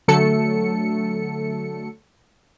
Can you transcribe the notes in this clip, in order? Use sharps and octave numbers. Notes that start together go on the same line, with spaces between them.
D3 F#3 A3 A4 C#7